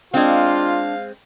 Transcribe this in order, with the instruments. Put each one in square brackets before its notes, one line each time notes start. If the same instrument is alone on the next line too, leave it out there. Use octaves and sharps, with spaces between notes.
[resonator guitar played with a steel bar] G#3 C4 [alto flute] D4 [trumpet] F4 [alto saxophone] F5